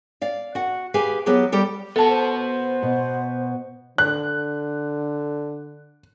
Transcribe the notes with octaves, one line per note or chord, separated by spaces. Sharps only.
D5 F5
F#4 F#5
G4 G#4 B4 F5 G#5
F#3 B3 F4 G4 G#4
G3 G4 A4
B3 F#4 A4 A5
C5
B2
D3 F#6